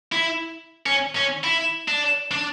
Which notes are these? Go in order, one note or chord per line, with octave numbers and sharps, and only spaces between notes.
E4
C#4
C#4
E4
D4
D4